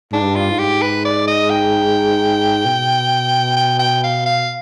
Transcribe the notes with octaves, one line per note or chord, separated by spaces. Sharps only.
G#2 D4
G2
F4
G#2
G4
B4
D5
D#5
G5
B2
G5
G5
F5
F5